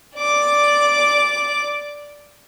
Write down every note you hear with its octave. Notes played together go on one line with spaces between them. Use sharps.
D5 D6